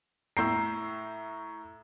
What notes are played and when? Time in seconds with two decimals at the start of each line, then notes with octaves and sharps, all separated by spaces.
0.37 A2 A#5 E6 G6 C7